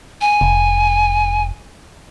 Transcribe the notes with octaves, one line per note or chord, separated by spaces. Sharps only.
G#5
F1